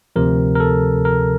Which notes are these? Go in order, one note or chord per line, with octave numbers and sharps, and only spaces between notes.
D2 C3 F3 A#4
A#4
A4
A#4